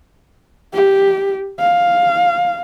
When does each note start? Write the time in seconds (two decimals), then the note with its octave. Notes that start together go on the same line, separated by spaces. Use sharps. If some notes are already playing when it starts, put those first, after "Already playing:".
0.73 G4
1.59 F5